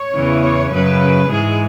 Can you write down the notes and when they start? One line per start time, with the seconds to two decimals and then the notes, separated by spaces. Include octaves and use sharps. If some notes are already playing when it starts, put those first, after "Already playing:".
Already playing: C#5
0.14 E2 C#3 E3
0.43 C#5
0.71 F#2 C#3 F#3 B4
1.28 G#2 E3 G#3 G#4